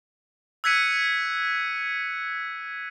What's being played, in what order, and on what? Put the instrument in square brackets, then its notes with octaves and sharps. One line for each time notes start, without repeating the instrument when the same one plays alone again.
[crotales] E6 F#6 G#6 B6 C#7 D#7